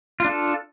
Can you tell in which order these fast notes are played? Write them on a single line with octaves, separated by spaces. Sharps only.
F4 D4 A4